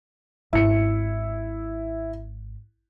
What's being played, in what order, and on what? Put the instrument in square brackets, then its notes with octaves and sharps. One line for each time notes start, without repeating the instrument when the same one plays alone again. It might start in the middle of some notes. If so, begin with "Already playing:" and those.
[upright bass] G#1 [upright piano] E4 C#7